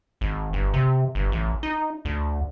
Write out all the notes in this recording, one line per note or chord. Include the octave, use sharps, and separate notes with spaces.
G#1
G1
C3
G1
A1
D#4
D2